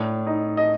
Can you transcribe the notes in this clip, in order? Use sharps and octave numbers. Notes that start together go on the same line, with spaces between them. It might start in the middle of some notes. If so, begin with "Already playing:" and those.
Already playing: A2 D4
D#4
D#5